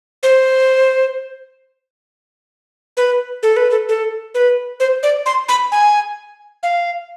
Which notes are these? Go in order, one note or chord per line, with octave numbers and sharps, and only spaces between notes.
C5
B4
A4
B4
A4
A4
B4
C5
D5
C6
B5
G#5
F5